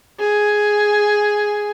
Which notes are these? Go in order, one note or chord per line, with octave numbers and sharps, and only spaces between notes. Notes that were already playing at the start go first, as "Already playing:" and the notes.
G#4